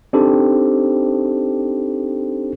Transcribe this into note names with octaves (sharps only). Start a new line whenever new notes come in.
C4 D4 D#4 G4 A4 C5